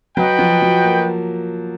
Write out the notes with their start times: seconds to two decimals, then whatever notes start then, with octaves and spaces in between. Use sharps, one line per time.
0.17 F#3 F#4 B4 D#5 G5
0.39 F3
0.62 F#3
0.84 A#3